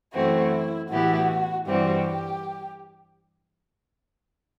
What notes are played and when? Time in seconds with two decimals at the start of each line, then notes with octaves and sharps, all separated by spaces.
0.14 F#2 E3 A3 C4 E4 F#4
0.89 A2 E3 B3 E4 F#4 G4
1.66 G2 E3 G3 C4 F#4 G4